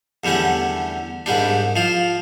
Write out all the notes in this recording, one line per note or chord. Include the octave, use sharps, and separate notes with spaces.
E2 D3 G3 A3 C#4
C2 G#2 G3 D4
F3 F4